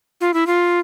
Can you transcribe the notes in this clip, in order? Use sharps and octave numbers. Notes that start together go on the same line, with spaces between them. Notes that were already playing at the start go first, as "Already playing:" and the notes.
F4
E4
F4